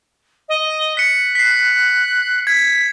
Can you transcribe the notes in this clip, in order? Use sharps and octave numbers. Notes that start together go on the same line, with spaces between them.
D#5
F#6 B6 C#7
B6 C7
G#6 B6